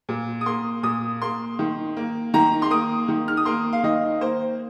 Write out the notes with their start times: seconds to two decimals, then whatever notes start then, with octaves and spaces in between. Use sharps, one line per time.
0.09 A#2
0.41 D#6
0.46 A#3 C6
0.83 A#2 D#6
1.22 A#3 C6
1.59 D#3
1.97 A#3
2.34 D#3 A#5
2.62 C6
2.70 A#3 D#6
3.08 D#3
3.28 F6
3.37 D#6
3.45 A#3 C6
3.73 F5
3.83 D#3 D#5
4.21 A#3 C5